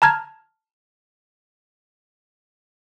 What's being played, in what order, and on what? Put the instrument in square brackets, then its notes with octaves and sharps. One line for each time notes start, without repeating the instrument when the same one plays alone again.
[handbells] A5 A#5 F6 G#6